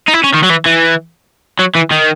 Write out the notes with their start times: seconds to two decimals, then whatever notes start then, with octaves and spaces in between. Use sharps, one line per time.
0.08 D#4
0.14 E4
0.24 C#4
0.35 D#3
0.44 F#3
0.50 E3
0.66 E3
1.59 F#3
1.75 E3
1.91 D#3